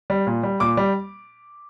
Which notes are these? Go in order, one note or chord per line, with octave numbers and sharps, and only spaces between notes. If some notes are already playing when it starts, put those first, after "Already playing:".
G3
A#2
G3
A#2 D6
G3